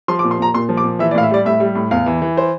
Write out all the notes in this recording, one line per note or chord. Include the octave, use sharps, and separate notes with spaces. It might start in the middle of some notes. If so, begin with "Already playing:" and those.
F3 C6
D6
A#2
C6
A#2 A#5
A#2 C6
F3
D6
A#2
E3 E5
D5
A2 F5
E5
G3 D5
A2 E5
G3
A2
E2 F5
E3
E3
C5